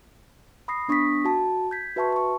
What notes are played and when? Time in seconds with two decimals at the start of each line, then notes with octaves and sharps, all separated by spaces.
0.68 B5 D#6 A#6 C7
0.88 B3 D4 C#6 D#6 A#6 B6
1.25 F#4 A5
1.71 G6 G#6 B6
1.96 F#4 B4 E5 A5 C6 C#6
2.12 A5 C#6